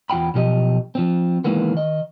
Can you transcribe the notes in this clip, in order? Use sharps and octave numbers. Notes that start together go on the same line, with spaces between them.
E2 F4 F#5 G5 B5
B1 B2 F3 G4 D5 D#5
F3 C4
D#3 E3 G#3 A#3 B3
D#3 D#5